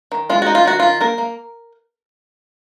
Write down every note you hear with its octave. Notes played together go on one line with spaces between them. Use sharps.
D#3
G#3 F4
D#4 F#4
F4
D#3 F#4
D#3 F4
A#3 A#4
A#3